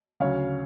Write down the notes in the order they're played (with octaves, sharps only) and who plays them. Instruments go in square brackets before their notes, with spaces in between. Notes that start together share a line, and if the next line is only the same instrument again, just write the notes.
[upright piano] D2 C#3 F#3 C#5 F5